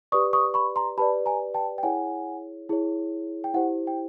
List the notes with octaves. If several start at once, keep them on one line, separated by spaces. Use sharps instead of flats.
G4 B4 D5 C#6 D#6
C#6 D#6
B5 C#6
A#5 C6
G4 B4 D5 A5 B5
G#5 A#5
G5 A5
G5
E4 G#4 C#5 F#5 G#5
E4 G#4 C#5
G5
E4 G4 C5 F#5
G5